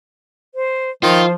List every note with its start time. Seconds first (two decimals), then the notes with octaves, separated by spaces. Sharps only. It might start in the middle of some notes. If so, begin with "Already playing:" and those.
0.55 C5
1.03 D#3 F3 F4 C5